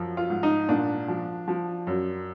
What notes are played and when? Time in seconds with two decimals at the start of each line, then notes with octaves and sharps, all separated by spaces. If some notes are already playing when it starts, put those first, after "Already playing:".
Already playing: F#2 F3
0.17 F4
0.30 G#2
0.43 D#4
0.69 A#2 D4
1.08 F3
1.48 F3
1.87 F#2